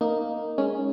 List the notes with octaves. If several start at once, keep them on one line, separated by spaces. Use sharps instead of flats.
A#3 D#4
G#3 C#4